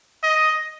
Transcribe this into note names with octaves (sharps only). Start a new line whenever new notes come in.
D#5